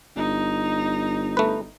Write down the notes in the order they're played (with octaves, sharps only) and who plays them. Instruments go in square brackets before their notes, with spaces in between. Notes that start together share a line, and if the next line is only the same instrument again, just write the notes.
[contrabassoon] G1 [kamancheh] D#4
[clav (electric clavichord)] A3 B4